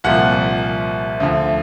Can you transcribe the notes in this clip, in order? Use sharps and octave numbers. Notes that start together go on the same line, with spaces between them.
C2 A#2 F3 F#5
D2 D3 F3